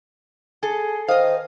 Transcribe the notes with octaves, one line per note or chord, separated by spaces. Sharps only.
G#4 A4
D#3 C5 D#5 F5